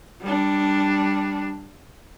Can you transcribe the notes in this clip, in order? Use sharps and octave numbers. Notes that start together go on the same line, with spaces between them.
G3 D4